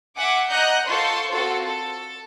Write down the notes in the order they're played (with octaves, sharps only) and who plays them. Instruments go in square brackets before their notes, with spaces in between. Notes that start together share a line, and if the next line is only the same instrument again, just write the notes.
[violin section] E5 F#5 G#5 D6
D#5 F#5 A#5 F#6 G6 C#7
F4 A4 C5 C6 C#6
C4 F4 F#4 A4
A4